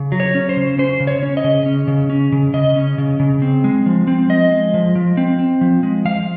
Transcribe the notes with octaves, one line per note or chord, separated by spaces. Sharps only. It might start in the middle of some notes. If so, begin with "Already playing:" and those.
Already playing: C#3
F#3
C#5
C#4
C5
C#3
C#4 C5
C#3
C#5
C#4
D#5
C#3
C#4
C#3
C#4
C#3
C#3 D#5
C#4
C#3
C#3
C4
G#3
F3
C4
F3 D#5
G#3
F3
F3
C4
C4
F3
G#3
F3 F5